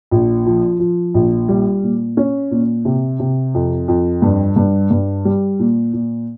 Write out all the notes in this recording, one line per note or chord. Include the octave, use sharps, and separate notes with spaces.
A#1
F3
F3
A#1
G3
A#2
C#4
A#2
C3
C3
F2
F2
G2
G2
G2
G3
A#2
A#2